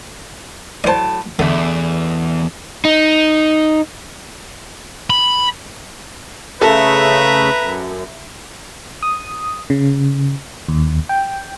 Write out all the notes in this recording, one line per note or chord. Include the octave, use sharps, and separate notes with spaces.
A2 F#3 C5 D5 A5
E2 B2 D3 A3 D4
D#4
B5
C#3 A3 A4 B4 E5 A#5
F#2
D#6
C#3
D#2
G5